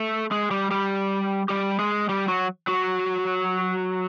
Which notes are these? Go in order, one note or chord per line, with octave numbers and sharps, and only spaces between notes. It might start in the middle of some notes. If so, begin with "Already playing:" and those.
Already playing: A3 A4
G#3 G#4
G3 G4
G3 G4
G3 G4
G#3 G#4
G3 G4
F#3 F#4
F#3 F#4